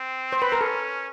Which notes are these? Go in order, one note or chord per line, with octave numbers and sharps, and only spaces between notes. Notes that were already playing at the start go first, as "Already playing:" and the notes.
Already playing: C4
C5
B4
A#4
C#4 A4